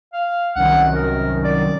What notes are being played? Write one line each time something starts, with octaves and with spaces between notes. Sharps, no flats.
F5
C2 F#2 D#3 F#5
A#4
D5